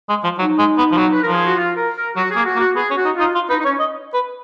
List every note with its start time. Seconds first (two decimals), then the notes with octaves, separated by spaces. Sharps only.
0.09 G#3
0.24 F3
0.38 F#3 D#4
0.58 G#3
0.78 B3
0.91 F3
0.97 F#3
1.12 B4
1.23 F3 A#4
1.34 G#4
1.46 F#4
1.57 F4
1.76 A#4
1.96 A#4
2.16 F#3 F#4
2.31 G#4
2.36 A#3
2.46 F#4
2.56 A#3
2.60 F#4
2.76 B3 G#4
2.90 C#4
2.96 F#4
3.05 D#4
3.15 D#4 F4
3.35 F4
3.49 D#4 B4
3.60 D#4
3.64 C#4 C#5
3.79 D#5
4.14 B4